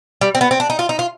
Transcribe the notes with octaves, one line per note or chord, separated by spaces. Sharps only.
G3
C4
B3
C4
D4
D#4
F4
D#4
F4